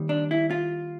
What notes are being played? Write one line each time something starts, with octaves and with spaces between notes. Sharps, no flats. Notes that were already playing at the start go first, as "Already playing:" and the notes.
Already playing: D#2 D#3 G3
D4
E4
F4